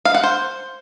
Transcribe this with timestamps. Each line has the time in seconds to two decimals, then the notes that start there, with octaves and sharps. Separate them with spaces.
0.05 F5
0.14 F#5
0.24 C5